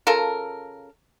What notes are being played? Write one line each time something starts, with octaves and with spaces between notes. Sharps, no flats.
C#3 F4 A4 A#4